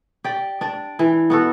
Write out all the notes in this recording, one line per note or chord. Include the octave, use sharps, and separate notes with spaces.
G4 D5
D4 D5
E3
B3 F#4 A4